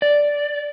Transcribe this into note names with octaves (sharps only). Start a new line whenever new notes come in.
D5